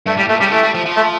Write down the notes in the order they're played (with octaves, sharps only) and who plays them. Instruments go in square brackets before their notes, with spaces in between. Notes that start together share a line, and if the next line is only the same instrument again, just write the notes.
[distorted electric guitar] G2 [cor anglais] A3
[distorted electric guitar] A2 [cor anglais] G3
[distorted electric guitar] A#2 [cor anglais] A3
[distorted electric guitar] C#3 [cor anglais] G3
[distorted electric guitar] E3 [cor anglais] A3
[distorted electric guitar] G3
F3
F3
[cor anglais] A3